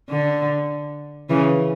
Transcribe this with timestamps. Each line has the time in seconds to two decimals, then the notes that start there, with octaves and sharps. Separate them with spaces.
0.10 D3
1.29 C#3 E3